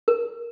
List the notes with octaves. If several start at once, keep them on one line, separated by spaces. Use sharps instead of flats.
A#4